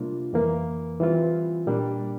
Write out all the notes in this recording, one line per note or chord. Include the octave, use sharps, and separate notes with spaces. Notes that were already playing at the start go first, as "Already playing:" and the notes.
Already playing: C3 G3 A#3 D4 F4
F2 E3 A#3
E3 G3 C4 F4
A#2 G3 A#3 D4